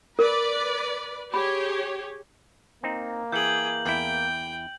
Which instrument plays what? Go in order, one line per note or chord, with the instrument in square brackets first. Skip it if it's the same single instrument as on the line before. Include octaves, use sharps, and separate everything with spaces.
[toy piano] A#4 [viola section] B4 D5
[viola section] G4 G#4 C#5 [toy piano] B5
[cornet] A#3 [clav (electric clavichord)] C4 D#4
[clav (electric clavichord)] E3 [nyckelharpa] G#4 G5 [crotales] G6 F#7
[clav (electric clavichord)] E2 E4 [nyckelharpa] G5